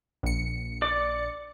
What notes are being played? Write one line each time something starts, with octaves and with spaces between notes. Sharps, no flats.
A#1 C#7
D5 D6